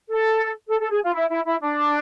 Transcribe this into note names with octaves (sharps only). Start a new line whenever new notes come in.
A4
A4
A4
G#4
F4
E4
E4
E4
D4